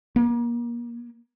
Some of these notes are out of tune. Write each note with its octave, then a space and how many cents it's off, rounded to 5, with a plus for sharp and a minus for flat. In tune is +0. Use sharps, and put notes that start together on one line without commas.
A#3 +30